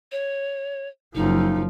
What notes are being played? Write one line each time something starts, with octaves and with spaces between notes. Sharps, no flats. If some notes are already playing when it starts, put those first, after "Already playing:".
C#5
F#1 F3 D#4